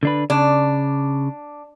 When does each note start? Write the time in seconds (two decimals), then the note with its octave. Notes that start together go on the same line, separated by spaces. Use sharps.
0.03 D3 D4 B4
0.30 C#3 D4